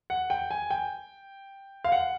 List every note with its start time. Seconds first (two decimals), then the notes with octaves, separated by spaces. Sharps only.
0.10 F#5
0.30 G5
0.51 G#5
0.70 G5
1.84 F5
1.92 F#5